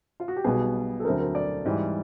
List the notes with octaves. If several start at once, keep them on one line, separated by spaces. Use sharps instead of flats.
F4
F#4
G4
B1 B2 G3 B3 G#4
A4
D2 D3 F#3 A3 C4 A#4
A#4
D5
G#2 E3 G3